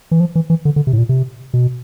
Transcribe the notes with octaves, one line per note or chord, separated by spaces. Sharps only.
E3
F3
E3
E3
D3
D3
C3
A2
A#2
C3
B2